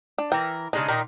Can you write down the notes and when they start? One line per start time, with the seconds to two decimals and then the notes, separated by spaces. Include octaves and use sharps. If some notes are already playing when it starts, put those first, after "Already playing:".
0.18 D4
0.32 E3 A#4 G5
0.73 C#3 G#3 D4 D#4
0.88 A#2 D#3 D#4